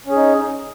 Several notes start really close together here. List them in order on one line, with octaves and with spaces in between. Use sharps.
C#4 G#4 D#4